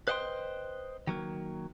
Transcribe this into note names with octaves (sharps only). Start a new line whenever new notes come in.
B4 C5 D#5 F5 G5 C6
D#3 F#3 A#3